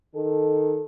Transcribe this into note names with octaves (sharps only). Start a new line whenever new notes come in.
D#3 A4